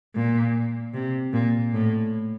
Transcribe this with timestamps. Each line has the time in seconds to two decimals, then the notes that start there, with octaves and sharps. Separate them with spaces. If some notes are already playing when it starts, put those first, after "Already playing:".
0.15 A#2
0.94 C3
1.33 A#2
1.73 A2